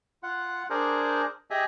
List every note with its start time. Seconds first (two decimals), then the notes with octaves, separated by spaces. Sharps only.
0.23 F4 F#5
0.70 D4 G#4 A#4 C5
1.51 G4 G#4 D#5 E5 G#5